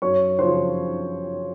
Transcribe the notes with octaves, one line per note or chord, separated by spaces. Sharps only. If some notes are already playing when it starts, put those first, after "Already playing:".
F#2 C#5 C#6
C#3 F3 C5 C6